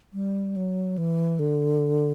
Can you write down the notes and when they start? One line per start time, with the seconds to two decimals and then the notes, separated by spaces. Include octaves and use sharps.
0.13 G3
0.56 F#3
0.98 E3
1.39 D3